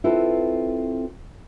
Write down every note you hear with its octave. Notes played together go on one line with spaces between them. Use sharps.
C4 E4 F4 A4 B4